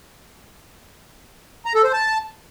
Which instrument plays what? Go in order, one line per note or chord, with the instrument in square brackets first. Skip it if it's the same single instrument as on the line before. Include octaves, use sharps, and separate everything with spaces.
[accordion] A#5
A4
C5
A5